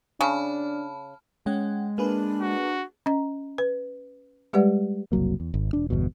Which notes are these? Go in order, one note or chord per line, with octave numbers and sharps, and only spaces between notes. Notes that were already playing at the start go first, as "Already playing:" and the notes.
C#3 D4 A5 B5 F6
G#3 C#4 F#5 G5
A#3 D4 G#4 B4
F#4
C#4 D#5 A#5
B4
G3 G#3 G4 B4 D5 F#5
F#1 C2 F#3 A#3
E2
G#1
E1 D4
G1 E2 B2